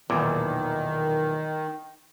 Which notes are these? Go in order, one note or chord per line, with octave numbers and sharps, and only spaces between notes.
B1 E2 A#2 D#3